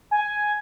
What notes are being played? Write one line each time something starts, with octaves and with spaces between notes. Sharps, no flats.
G#5